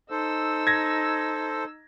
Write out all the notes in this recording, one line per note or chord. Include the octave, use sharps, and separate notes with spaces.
D#4 A4 C5 E6
G#6 A#6